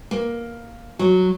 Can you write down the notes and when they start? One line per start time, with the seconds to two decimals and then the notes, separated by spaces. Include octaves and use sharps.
0.11 A#3
0.99 F#3